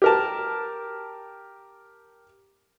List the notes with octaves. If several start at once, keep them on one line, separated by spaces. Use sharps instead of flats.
G4 A#4 A5